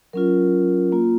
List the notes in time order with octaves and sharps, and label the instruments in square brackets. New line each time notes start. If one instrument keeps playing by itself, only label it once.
[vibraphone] F#3 C#4 F4 A#4
A#3 F4